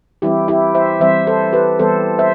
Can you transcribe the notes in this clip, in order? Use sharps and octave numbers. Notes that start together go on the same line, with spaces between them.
E3 G3 C4 E4 G4
E4 G4
C5 E5
E3 G3 C4 C5 E5
A4 C5
G4 B4
E3 G3 B3 A4 C5
C5 E5